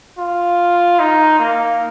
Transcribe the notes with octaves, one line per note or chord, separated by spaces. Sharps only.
F4
D#4
A#3